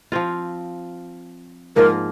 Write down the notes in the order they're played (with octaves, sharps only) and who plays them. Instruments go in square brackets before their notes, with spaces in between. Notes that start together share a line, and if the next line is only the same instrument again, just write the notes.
[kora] F3 C4 F4
[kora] G#2 F3 A#3 F4 [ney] A#4